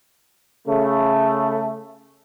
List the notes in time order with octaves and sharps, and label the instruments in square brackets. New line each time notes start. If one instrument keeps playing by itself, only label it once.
[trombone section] C#3 A3